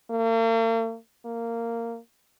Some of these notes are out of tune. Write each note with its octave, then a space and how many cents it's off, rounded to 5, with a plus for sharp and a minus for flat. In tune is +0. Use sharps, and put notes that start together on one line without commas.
A#3 -45
A#3 -15